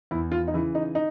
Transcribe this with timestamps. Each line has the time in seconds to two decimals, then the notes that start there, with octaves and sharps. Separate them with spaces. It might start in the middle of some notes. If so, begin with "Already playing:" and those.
0.11 E2 E4
0.32 F4
0.48 D#4
0.53 C#3 E3 E4
0.75 D#4
0.95 D#4